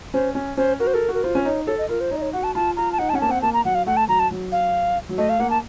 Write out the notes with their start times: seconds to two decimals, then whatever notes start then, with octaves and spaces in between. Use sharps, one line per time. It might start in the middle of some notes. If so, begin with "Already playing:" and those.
0.14 C#4 C5
0.35 C#4
0.57 C#4 C5
0.80 F#4 A#4
0.87 C5
0.94 A4 A#4
1.09 F#4
1.15 A#4
1.24 F4 C5
1.35 C#4
1.45 D#4 C#5
1.67 A4 C#5
1.78 D#5
1.89 F4 A#4
2.01 C5
2.11 D#4 C#5
2.16 D#5
2.22 C#5
2.33 F#4 F#5
2.44 A5
2.55 F4 A5
2.77 F4 A#5
2.92 A5
2.99 D#4 F#5
3.09 A5
3.13 C#4 F#5
3.21 A#3 A5
3.28 C4 F#5
3.42 A#3 A5
3.54 A#5
3.65 F#3 F#5
3.75 F5
3.86 A3 F#5
3.97 A5
4.08 F#3 A#5
4.20 A5
4.31 F#3
4.52 F5
5.09 F#3
5.18 A3 D#5
5.29 F5
5.39 A#3 F#5
5.50 A5